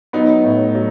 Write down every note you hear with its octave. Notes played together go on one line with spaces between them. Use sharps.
F#3 B3 D#4
A2
F#3